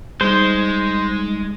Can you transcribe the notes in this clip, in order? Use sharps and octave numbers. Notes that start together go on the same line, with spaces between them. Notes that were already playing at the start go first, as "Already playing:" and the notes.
G3 G#3 D#4 C5